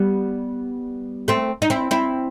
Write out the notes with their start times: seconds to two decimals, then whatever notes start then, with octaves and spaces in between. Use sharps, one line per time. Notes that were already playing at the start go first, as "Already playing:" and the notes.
Already playing: G3 B3
1.28 A3 C4
1.62 D#4
1.70 C4 E4
1.91 C4 E4